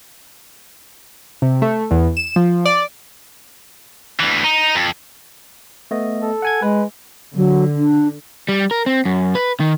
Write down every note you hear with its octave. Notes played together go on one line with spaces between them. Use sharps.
C3
A3
E2
E7
F3
D5
D2 E3
D#4
F2
A3 B3 D#5
A4
F#5 G#5 G#6
G#3 B4
D3 F#3
D4
G3
A#4
C4
F#2
B4
D#3